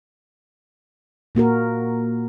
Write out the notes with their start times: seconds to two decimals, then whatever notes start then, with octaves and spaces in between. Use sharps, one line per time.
1.35 A#2 A#3 F#4 A#4